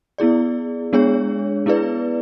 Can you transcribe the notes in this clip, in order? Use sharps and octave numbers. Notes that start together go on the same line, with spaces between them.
B3 E4 G#4 D5
G#3 B3 D4 G#4 C#5
B3 E4 G#4 B4 D5